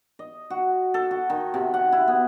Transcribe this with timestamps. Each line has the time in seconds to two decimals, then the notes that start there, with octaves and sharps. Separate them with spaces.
0.19 D#5
0.50 F#4
0.94 A4
1.11 F#4
1.30 D#3
1.54 C3
1.74 F#5
1.92 E4
2.08 B3